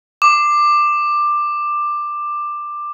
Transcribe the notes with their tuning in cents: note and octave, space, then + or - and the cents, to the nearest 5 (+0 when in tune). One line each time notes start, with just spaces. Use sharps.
D6 +15